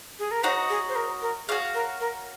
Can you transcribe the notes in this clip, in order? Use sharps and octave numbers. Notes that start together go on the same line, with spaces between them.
G#4
A#4
D#4 F#4 C5 C#5 F#5
G#4
C5
A#4
A#4
F#4 G#4 C#5 F5
A#4
A#4